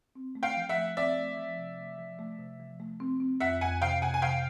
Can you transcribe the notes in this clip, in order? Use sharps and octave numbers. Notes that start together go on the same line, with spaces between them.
C4
A3
F5 G5
F3
E5 F#5
A3
C4 D5 E5
A3
F3
C3
A3
F3
A3
C3
F3
A3
C4
C4
F2 E5 F#5
F2 F#5 G#5
C3 F5 G5
C3 F#5 G#5
G#5
C3 F5 G5